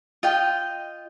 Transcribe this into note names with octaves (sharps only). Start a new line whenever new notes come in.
F4 D#5 G5